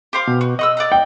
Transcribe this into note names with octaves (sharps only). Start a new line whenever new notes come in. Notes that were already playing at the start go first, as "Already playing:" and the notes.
G4 C5 F5
B2
F#4
D#5 F#5 C#6 E6
D5 F#5 A#5
G5